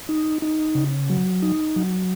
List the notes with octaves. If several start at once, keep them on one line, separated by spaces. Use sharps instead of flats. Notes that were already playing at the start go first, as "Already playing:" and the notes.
D#4
D#4
C#3
F#3
D#4
F#3